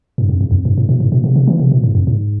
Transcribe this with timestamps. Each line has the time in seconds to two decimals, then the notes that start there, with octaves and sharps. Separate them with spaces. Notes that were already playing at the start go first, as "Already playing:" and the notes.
0.18 G2
0.29 F2
0.41 E2
0.51 F2
0.65 G2
0.78 G#2
0.89 A#2
1.00 G#2
1.12 A#2
1.24 C3
1.36 C3
1.47 E3
1.59 C3
1.72 A#2
1.84 G#2
1.95 F2
2.07 G#2